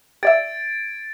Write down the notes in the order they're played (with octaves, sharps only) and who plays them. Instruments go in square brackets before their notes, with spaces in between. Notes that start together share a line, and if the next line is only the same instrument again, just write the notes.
[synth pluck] G4 D5 E5 [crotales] G#6 A6 D7